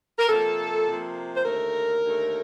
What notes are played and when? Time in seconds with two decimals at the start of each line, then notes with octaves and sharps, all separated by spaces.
0.18 A#4
0.28 C3 F3 A#3 A4
0.86 C3 F3 A#3
1.36 C5
1.44 D#2 D3 A3 A#4
2.02 D#2 D3 A3